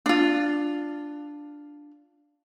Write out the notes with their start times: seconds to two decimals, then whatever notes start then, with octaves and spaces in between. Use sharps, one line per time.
0.06 D4 F4